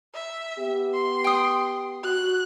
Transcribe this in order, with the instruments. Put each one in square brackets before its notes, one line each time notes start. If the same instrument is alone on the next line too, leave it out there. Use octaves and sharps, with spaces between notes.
[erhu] E5
[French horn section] B3 G4
[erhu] C6
[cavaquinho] G5 D#6
[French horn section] F#4 [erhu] F#6